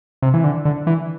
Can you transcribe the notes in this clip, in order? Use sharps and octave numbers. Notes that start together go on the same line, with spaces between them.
C3
E3
D3
D3
E3